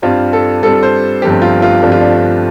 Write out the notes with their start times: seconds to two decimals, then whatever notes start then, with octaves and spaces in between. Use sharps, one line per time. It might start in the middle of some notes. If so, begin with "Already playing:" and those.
0.02 G2 G3 C4 F4
0.33 A4
0.62 G2 G3 C4 A4
0.83 C5
1.22 G1 G2 F3 A3 C4 G4
1.42 F4
1.62 F4
1.82 G1 G2 F3 A3 C4 D4
1.92 F4
2.01 D4
2.12 D4